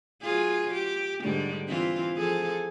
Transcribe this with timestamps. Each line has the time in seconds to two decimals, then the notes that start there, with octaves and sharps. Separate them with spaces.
0.22 F#3 F4 G#4
0.73 G4
1.24 G#2 D3 G3
1.68 E3 C4 F4
2.16 F3 G#4 A4